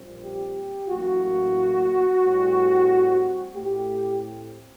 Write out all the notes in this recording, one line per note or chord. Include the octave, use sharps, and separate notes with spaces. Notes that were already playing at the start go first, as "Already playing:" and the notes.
Already playing: A#1 A#2 G3 C4
G4
A1 A2 F#3 A#3 F#4
A2 G3 C4
A2 A3 C4 G4